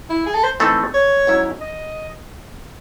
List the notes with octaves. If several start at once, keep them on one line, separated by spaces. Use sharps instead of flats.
E4
G#4
A4
C5
E3 A3 C4 D#4 A4
C#5
G#2 F#3 C#4 E4
D#5